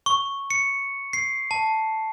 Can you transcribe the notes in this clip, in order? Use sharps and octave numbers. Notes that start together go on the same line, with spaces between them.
C#6
C#7
C7
A5